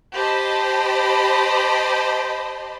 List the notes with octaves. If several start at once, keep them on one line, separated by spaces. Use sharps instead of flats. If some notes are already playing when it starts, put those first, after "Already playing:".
G4 C5 D#5 A5 B5